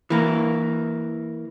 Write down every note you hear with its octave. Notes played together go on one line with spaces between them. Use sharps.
E3 A#3